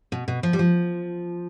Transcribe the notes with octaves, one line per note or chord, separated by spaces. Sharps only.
B2
B2
F3
G3
F3